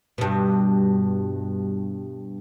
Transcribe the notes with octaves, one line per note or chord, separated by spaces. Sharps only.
G2 B2